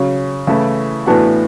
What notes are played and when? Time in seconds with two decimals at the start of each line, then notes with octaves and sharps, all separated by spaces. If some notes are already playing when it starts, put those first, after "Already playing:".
Already playing: C#3 F#3 C#4
0.47 C#3 E3 A3 E4
1.06 A2 E3 B3 D4 F#4